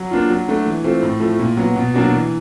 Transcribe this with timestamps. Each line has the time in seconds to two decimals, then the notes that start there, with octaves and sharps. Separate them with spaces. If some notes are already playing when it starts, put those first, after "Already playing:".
Already playing: F#3
0.11 A#3 D4 F4
0.30 F#3
0.48 A3 D4
0.66 E3
0.84 A3 C4 F4
1.02 A2
1.20 F3 A3
1.39 A#2
1.57 F#3 B3
1.76 B2
1.94 F#3 A#3 D4 F#4
2.12 E3